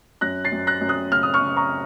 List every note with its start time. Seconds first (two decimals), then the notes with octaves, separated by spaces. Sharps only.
0.21 F#2 F#6 A#6
0.45 A6 C7
0.52 F#2
0.67 F#6 A#6
0.81 F#2
0.89 D#6 F#6
1.12 C#3 F6
1.23 D#6
1.34 C#6 F6
1.41 C#3
1.57 A#5 C#6